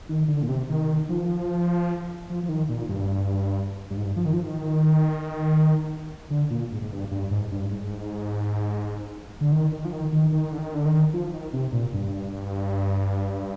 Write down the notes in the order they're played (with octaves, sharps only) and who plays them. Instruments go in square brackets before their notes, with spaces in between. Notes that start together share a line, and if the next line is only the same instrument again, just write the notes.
[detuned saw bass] D#3
D3
A#2
C3
D#3
F3
F3
F3
D#3
A#2
G2
G2
G#2
G2
F3
D#3
F3
D#3
D3
A#2
G#2
G#2
G2
G2
G#2
G2
G#2
D3
D#3
D#3
F3
D#3
D#3
D#3
D3
D#3
D3
D#3
F3
D#3
C3
A#2
G2